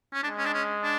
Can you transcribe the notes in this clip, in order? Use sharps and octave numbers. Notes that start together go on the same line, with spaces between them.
C#4
G#3 D4
C#4
D4
C#4
D4